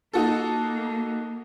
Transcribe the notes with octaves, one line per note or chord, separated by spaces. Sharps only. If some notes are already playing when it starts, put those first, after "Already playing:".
A#3 D#4 F#4 A4